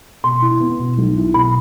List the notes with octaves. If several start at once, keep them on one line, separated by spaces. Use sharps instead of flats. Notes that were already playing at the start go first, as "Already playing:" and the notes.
B2 C6
E4
B3
B2
B1
E4
B2 B5